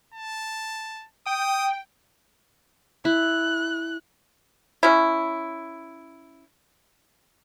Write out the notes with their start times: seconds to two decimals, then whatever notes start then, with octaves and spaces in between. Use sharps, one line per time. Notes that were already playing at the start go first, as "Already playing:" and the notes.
0.14 A5
1.26 G5 D#6
3.05 E4 F#6
4.83 C#4 E4